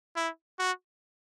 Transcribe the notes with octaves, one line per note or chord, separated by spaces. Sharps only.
E4
F#4